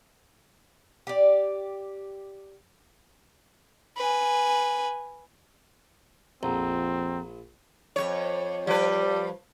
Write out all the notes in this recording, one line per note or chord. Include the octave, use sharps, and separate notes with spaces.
G4 D5
B4 G#5
A#1 F2 C4 F#5 A#5
F2 F#3 C#5
F3 G3 B4